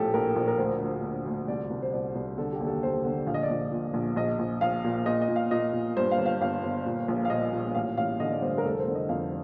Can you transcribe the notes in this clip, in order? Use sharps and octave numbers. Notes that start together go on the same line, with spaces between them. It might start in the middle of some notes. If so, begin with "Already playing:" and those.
Already playing: A#1 A2 G4 A4
A#1 A#4
A#1
A#4
D2 C5
D2
D2
D2
C2 D5
C2
C5
C2 D5
C2
D3 A4
G4
D#2
A4
D#2 C5
D3
A#1 F5
D#5
D5
A#1 D#5
A#2
A#1
A#1 D#5
A#1
A#1 F5
A#2
A#2 D#5
D#5
A#2
F5
A#2 D#5
A#2
G2 C5
F5
G1
F5
G1 F5
G1
A#2
A#1
F5
A#2 D#5
A#2
A1 F5
A1 F5
D3 D#5
D5
G2 C5
A#4
F1 A4
C5
D3
D#5
F2 F5